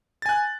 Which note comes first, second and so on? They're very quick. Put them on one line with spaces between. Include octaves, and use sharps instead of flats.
A6 G#5 F#6